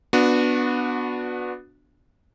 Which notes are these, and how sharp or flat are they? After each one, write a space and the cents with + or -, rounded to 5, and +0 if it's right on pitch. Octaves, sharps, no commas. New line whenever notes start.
B3 +0 D4 +0 F#4 -25